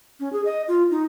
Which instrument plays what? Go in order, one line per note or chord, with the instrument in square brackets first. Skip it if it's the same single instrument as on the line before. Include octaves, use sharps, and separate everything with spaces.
[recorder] C#4
G#4
D#5
F4
D#4